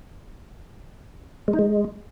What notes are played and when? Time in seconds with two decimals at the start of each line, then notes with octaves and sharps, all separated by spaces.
1.48 G#3
1.53 D#4
1.59 G#3